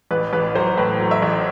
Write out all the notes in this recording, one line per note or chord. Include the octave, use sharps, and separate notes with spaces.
A1 B4
A1 B4
F#3 C5
A2 B4
F#3
E5
A1